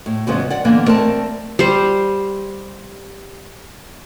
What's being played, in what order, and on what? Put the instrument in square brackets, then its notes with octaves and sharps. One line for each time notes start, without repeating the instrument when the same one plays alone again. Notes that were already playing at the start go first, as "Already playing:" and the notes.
[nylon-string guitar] A2
E2 C#3 F3 G#3 B3
D5 F#5
D3 E3 A#3 B3
A3 C4 A#4 D5 A5
[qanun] G3 C5